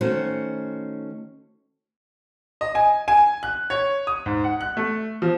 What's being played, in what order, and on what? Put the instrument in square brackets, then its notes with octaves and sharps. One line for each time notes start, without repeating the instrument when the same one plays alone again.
[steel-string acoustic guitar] D#3 A3 C#4 F#4 C5
[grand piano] D#5
G#5
G#5
F#6
C#5
D#6
G#2
F#5
F#6
A3
F3